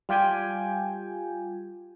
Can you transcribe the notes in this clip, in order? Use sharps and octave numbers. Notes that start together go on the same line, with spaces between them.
G3 F4 G4 G5 G#5